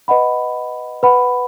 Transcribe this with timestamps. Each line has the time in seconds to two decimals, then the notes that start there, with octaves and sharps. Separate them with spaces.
0.08 B4 D#5 F#5 B5
1.03 B4 F#5 B5